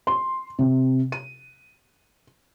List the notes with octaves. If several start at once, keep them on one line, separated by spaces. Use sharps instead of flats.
C6
C3
D#7